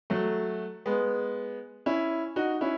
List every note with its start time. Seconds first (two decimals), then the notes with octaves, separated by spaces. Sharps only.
0.10 F#3 A3
0.86 G#3 B3
1.86 C#4 E4
2.36 D#4 F#4
2.61 C#4 E4